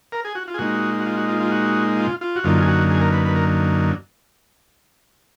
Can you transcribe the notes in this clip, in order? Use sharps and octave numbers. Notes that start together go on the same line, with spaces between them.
A#4
G#4
F#4
F4
G#4
A#2 G#3 D#4 F#4
F#4
F4
F#4
F4
F4
F#4
F4
F4
F#4
F#2 D3 F#3 A#3 D#4 F4
G#4
F#4
G#4
A#4
B4
B4
A#4